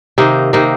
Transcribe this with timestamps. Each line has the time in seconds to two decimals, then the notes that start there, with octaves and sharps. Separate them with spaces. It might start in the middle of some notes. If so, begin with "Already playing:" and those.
0.18 C3 D#3 A#3 D#4
0.53 C3 D#3 A#3 D#4